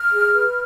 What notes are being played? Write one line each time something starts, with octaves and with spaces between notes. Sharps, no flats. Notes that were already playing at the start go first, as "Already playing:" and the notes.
Already playing: F6
G#4
B4